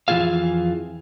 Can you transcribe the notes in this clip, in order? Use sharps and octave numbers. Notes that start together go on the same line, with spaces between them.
F2 E3 D4 F4 G#4 F5